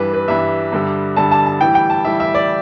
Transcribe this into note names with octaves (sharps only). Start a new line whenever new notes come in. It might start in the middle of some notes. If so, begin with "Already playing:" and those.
Already playing: G2 E3 G3 B4
B4
G2 E3 G3 E5
G2 D3 G3
G2 D3 G3 A5
A5
A5
A2 E3 G3 G5
G5
A5
A2 E3 G3 E5
E5
D5